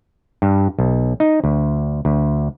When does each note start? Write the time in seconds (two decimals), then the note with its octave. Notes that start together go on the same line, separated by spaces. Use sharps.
0.42 G2
0.79 B1
1.20 D#4
1.44 D2
2.05 D2